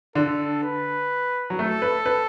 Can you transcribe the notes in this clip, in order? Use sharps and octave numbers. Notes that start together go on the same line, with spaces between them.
D3 A4
B4
F#3
A3 A4
B4
B4